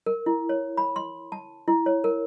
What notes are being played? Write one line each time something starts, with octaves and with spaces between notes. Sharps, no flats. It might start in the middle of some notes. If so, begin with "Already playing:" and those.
A#4
E4
C#5
B5
C6
A5
E4
C#5
A#4